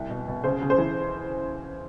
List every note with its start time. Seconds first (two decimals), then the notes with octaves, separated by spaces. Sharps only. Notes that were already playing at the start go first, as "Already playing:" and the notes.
Already playing: C2
0.10 B2
0.28 B2
0.44 C#3 C5
0.62 C#3
0.70 C5
0.78 E3